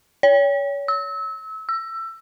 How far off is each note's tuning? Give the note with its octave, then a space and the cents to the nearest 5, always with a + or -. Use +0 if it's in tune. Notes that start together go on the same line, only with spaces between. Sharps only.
C#5 +30
E6 -30
E6 +20